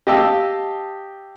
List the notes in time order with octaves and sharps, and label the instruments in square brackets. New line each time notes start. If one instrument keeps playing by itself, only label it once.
[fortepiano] G4 D#5 F5 G5 A5 E6